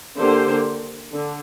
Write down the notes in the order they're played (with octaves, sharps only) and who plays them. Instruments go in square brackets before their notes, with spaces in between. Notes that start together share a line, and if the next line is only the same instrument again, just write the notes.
[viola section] D3 A#3 G4 C5
D3